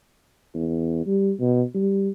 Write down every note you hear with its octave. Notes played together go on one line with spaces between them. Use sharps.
E2
G3
B2
G3